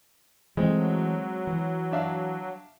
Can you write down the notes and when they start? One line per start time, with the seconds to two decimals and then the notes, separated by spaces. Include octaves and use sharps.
0.57 E3 F#3 G#3 A3 C4
1.47 E3
1.92 D4 E5 F5